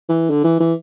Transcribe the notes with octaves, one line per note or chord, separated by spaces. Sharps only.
E3
D3
E3
E3